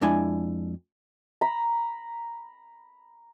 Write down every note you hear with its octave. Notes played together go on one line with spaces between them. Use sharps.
F2 G#3 D4 E4 G#5
A#5 B5